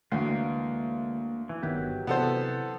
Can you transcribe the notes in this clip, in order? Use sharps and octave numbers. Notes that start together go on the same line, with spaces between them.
D2 D3 E3 G#3 A#3 F5
E3
G1 D#3 F#3 B3 G4 B4
C3 E3 B3 A4 C5